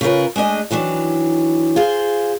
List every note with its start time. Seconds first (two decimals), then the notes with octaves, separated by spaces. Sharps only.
0.01 C#3 C#4 F4 A#4 B4
0.36 G#3 A3 D4 D#5 G#5
0.71 D#3 E3 F#3 D4
1.76 F4 G#4 C5